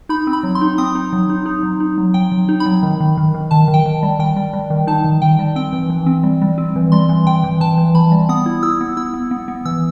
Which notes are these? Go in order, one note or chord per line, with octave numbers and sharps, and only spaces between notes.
D#4 B5
C4
B5
F#3
C6
D#4
C4 D#6
D#4
F#3
D#4
D#4
F#3
D#4
F#3
F#3 G5
F#3
D#4
B5
F#3
D#3
D#3
D#3
D#3
D#3 A5
D#3
G5
D#3
G3
D#3 G5
G3
G3
D#3
D#4 A5
D#3
D#3 G5
G3
C4 G5
E3
E3
C4
G3
G3
C4
E3
G3 C6
E3
E3 G5
E3
E3 A5
E3
E3 B5
G3
B3 D#6
E4
E4 E6
B3
E4 E6
B3
B3
B3
E3 E6